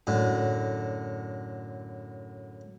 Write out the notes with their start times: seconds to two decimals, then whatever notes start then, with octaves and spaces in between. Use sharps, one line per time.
0.07 F#2 A2 D3